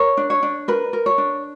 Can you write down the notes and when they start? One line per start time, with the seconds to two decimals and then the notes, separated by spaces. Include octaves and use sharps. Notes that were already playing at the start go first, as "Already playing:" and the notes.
Already playing: A#4 C#5
0.17 D4
0.30 C#5
0.43 D4
0.68 A#4 B4
0.93 A#4
1.06 C#5
1.18 D4